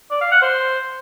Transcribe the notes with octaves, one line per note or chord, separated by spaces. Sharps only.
D5
F5
F#5
C5